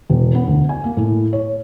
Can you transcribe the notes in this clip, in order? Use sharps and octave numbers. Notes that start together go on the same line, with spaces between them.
E1
B3
D2
G#5
A#3
A2
C#5